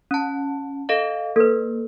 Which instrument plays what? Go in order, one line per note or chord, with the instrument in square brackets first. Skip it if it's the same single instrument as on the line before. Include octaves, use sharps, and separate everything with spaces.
[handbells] C#4 A5
A4 D#5 F5
[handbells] A#3 [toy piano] A4 B4